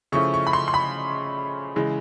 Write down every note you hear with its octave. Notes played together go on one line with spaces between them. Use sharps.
C#3 F3 A3 C#4 E4 C#6
C#6
B5
C6
C6
B5
C#3 E3 G#3